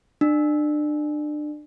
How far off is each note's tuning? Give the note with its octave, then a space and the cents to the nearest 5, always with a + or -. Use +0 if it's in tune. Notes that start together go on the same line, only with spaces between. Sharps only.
D4 +30